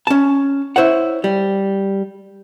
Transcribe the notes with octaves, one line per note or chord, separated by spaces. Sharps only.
C#4 A5
E4 C5 C#5 F#5
G3